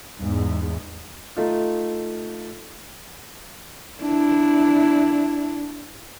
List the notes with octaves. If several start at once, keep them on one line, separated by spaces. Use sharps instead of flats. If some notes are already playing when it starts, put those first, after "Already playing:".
E2 G#2
A3 D#4 F4
D4 E4